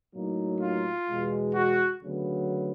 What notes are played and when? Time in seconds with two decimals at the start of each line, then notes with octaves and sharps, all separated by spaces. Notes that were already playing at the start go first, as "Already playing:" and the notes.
0.13 A2 F#3 A#3 D#4
0.61 F4
1.07 E2 B2 G#3
1.54 F#4
2.01 D2 C#3 F#3 B3